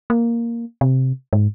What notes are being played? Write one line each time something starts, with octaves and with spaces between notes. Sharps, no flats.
A#3
C3
G#2